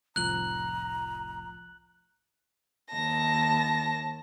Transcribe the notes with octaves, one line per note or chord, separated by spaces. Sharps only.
F1 C2 A2 F3 A#5 F#6 F#7
D#2 A5 A#6